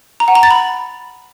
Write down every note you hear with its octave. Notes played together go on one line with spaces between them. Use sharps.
A#5
F#5
A#5
A6
B5